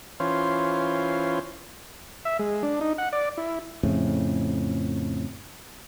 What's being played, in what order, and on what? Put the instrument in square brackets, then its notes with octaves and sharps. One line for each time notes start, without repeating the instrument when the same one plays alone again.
[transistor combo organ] E3 C#4 F4 C5
E5
G#3
D4
D#4
F#5
D5
E4
[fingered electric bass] F2 A2 C#3